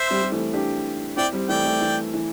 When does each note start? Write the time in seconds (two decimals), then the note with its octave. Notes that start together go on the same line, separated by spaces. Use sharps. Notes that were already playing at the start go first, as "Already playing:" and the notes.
Already playing: C5 E5
0.10 G3 C4
0.22 G3
0.32 E3 A3
0.53 D4 G4
1.17 C4 E4 D5 G5
1.33 G3 C4
1.49 E3 A3 D5 G5
1.65 E3 A3
1.81 E3
2.14 E3